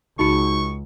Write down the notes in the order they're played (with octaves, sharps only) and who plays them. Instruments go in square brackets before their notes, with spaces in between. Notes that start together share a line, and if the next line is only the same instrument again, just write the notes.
[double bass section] C#2 [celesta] D#4 F#4 C#7 [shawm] C#6